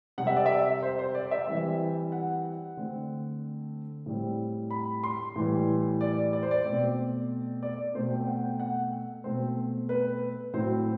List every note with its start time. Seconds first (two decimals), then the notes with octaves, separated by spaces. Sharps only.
0.18 C3 G3 C4 F#5
0.27 E5
0.36 D5
0.46 E5
0.83 C5
0.99 C5
1.15 D5
1.31 E5
1.47 E3 G3 C4
2.12 F#5
2.77 D3 A3 C4
4.06 A2 G3 C4
4.71 B5
5.03 C6
5.36 A2 E3 G3
6.01 D5
6.33 D5
6.43 C5
6.51 D5
6.65 B2 A3 C4
7.63 D5
7.94 B2 A3 C4 C5
8.11 G5
8.27 F#5
8.44 G5
8.60 F#5
9.24 B2 A3 C4 C5
9.89 B4
10.54 A2 F#3 C4 C5